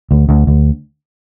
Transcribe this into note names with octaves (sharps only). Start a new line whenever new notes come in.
D2
D2
D2